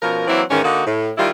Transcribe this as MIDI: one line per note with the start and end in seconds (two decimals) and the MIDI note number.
0.01 0.27 47
0.01 0.27 53
0.01 0.27 61
0.01 0.27 70
0.28 0.43 52
0.28 0.43 54
0.28 0.43 58
0.28 0.43 60
0.28 0.43 64
0.50 0.64 44
0.50 0.64 51
0.50 0.64 52
0.50 0.64 61
0.64 0.83 50
0.64 0.83 58
0.64 0.83 63
0.64 0.83 66
0.86 1.11 45
1.18 1.30 51
1.18 1.30 55
1.18 1.30 64
1.18 1.30 65